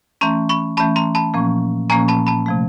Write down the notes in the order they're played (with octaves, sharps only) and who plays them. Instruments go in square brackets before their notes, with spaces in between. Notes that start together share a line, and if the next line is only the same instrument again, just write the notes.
[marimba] E3 A3 C#4 [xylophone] A#5 C6
[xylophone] B5 C#6
[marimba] E3 A3 C#4 [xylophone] A5 B5
[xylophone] A#5 C6
A5 B5
[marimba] A#2 F3 A#3 C#4
[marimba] A#2 F3 A#3 C#4 [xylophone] G#5 A#5
[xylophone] A5 B5
A5 B5
[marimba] C3 F3 A3